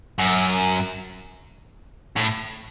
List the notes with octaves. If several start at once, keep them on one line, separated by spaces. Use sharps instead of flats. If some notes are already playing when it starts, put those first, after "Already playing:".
F#2
A2